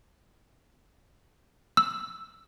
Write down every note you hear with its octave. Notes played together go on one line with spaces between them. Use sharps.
E6